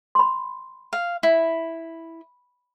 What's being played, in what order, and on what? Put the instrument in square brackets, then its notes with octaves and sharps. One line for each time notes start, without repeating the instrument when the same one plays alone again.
[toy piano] B5 C6
[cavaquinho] F5
E4